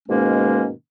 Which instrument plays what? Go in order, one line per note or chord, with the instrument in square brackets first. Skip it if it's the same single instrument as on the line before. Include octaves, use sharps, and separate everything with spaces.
[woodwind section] G#2 B2 D#3 G#3 A#3 C#4